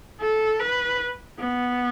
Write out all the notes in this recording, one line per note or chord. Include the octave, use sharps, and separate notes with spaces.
A4
B4
B3